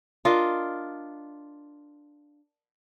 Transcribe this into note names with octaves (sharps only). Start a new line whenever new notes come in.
D4 F4 A#4 D#5